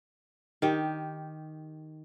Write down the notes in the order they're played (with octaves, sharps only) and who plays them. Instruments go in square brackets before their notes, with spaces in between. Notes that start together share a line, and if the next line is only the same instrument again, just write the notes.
[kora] D#3 G4